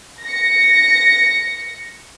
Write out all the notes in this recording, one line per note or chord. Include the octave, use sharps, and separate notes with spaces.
A#6 C#7